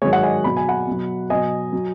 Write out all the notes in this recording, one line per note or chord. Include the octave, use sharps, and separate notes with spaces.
G#2 D#3 F#3 G#4 C#5
C#5 F#5
D#5 G#5
B2 F#3 B5
G#5
F#5 B5
B2 F#3
B2 F#3 D#5 G#5
F#3